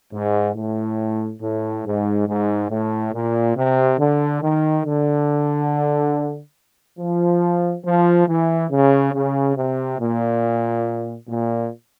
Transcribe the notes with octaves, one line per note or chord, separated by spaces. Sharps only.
G#2
A2
A2
G#2
G#2
A2
A#2
C3
D3
D#3
D3
F3
F3
E3
C#3
C#3
C3
A#2
A#2